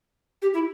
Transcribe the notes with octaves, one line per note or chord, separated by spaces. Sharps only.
G4
E4